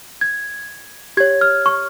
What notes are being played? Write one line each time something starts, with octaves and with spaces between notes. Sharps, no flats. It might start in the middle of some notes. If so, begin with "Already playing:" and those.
G#6
G4 C#5 G#6
F6
C#6